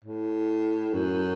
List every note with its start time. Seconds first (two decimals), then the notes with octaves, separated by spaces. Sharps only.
0.04 A2
0.93 F#2